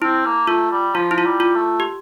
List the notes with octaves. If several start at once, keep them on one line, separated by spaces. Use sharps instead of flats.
C4 E4
A#3
A3 F4
G3
F3 F4
E4
F4
G3
F4
A3
G4